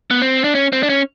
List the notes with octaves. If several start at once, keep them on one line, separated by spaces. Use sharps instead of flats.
B3
C4
D4
C#4
C4
D4
C#4